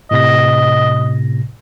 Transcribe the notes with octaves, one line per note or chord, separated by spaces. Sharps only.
A2 C3 D#5 A#6